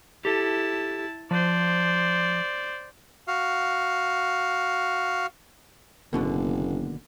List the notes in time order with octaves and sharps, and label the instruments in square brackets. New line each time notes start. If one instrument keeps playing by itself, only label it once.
[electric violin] E4 A5 [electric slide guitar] G4 A4
[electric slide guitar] F3 [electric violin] C5 D5
[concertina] F#4 F5
[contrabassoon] F#1 [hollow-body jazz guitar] D#2 B2 D3